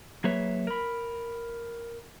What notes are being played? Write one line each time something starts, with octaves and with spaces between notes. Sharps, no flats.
F#3 A#3 G#4 B4 C#5 E5
A#4 B5